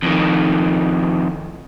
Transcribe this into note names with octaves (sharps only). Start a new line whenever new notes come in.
F2 D#3